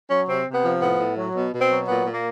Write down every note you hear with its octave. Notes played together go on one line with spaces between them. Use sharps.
F#3 C#4
C3 C4
C3
B3
F3
A2 B3
A2
F#3
B2
B2
C4
F#3
A#2 B3
A#2
A#3